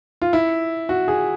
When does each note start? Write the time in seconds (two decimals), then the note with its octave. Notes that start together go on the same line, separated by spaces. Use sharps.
0.22 F4
0.33 E4
0.89 F#4
1.08 G#4